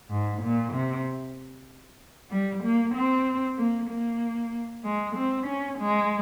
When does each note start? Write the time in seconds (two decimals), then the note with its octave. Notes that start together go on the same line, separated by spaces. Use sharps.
0.10 G#2
0.42 A#2
0.73 C3
2.31 G3
2.63 A#3
2.95 C4
3.57 A#3
3.89 A#3
4.84 G#3
5.16 C4
5.46 C#4
5.79 G#3